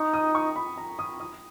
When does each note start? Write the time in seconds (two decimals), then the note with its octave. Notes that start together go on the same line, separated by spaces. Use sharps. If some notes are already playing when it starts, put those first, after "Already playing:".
Already playing: D#4 C#6
0.14 D#6
0.35 C#6
0.56 B5
0.78 A#5
0.99 D#6
1.20 D#6